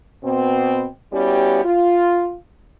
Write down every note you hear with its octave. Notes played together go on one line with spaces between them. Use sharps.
B2 C4
G3 B3 C#4 E4 F#4 G4
F4